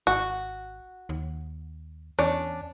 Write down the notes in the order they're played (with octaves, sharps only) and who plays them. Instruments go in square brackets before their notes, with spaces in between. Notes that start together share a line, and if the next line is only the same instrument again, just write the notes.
[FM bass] G#1 [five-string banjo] F#4
[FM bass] D#2
[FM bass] E2 [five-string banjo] C#4 D4 D5